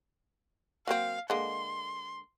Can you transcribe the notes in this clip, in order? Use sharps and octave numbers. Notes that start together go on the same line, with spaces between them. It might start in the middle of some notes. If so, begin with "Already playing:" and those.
F#3 A#3 C4 F5
D3 G#3 A#3 C6